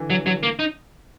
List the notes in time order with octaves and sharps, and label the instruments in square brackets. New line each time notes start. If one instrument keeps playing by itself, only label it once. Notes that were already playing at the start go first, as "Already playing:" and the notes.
Already playing: [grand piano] D3 E3
[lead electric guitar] F#3
F#3
A#3
D#4